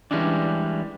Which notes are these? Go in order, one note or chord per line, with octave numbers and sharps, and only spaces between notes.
E3 F3 G3 G#3 C#4 D4